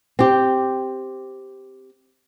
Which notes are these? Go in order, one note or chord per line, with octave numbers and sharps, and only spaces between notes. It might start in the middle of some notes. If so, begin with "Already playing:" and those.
C4 G4